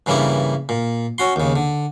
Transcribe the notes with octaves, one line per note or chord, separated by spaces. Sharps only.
G2 C#3 E3 G3 A#3 E4
A#2
C#4 F#4 C6
D#2 C#3
D3